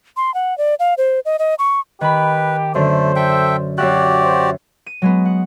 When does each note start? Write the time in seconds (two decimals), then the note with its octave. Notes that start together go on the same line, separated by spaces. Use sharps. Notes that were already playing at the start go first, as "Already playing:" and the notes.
0.17 C6
0.34 F#5
0.58 D5
0.80 F5
0.98 C5
1.25 D#5
1.39 D#5
1.59 C#6
2.01 D#3 G4 B4 B5
2.75 F#2 D3 A3 C5
3.16 A4 E5 G5
3.78 F#2 F#4 G4 D5 E5 F#6
4.23 C5
4.86 D#7
5.02 F#3 G#3 B3
5.25 F#5